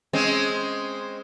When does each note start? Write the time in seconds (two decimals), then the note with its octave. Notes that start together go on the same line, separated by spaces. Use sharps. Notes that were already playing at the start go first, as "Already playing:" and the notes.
0.13 G#3 C4 C#4